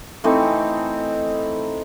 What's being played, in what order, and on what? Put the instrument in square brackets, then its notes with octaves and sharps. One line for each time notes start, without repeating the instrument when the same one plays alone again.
[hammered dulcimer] E3 A3 C4 D#4